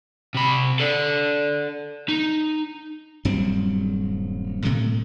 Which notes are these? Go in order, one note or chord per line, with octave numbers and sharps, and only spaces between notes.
C3 B5
A4 D5
D#4
D#1 G2 F#3 C4
A2 C3 G#3 A3